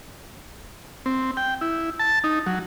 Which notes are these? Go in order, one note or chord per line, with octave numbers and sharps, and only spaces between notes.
C4
G5
E4
A5
D#4
F#3